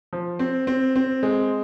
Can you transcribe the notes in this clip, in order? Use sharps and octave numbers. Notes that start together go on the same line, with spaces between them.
F3
C4
C4
C4
G#3